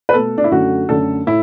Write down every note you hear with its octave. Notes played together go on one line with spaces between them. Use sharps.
B4
B2 A3 A4
D4
E4
F#2 D3 A3 F#4
F#2 D3 A3 A4
A2 E4